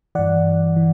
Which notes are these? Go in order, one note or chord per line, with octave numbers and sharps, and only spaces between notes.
G2 E3 D5 F#5
E3